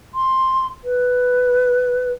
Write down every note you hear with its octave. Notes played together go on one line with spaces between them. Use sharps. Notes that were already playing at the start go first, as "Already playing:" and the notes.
C6
B4